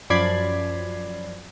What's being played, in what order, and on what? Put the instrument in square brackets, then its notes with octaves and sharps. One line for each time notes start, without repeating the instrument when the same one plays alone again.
[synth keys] F#2 F3 D5 B5 G#6 C7